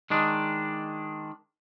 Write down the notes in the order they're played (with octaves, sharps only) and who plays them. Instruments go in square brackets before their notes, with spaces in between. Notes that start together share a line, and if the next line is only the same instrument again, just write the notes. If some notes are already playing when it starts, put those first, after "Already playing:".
[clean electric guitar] D#3 G#3 D4